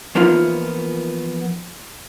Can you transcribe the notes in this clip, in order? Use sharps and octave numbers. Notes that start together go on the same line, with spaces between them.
E3 F3 A#3 B3 D#4 F4